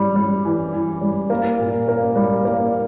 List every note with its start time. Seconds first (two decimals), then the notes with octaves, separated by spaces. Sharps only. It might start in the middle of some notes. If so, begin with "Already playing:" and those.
Already playing: G3
0.16 G3
0.45 E3
0.73 E3
1.01 G3
1.30 A#3
1.59 A#2
1.88 A#3
2.16 G3
2.45 A#3